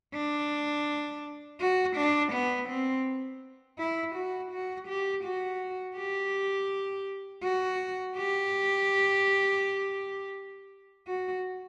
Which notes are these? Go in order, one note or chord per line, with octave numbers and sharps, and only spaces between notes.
D4
F#4
D4
B3
C4
E4
F#4
F#4
G4
F#4
G4
F#4
G4
F#4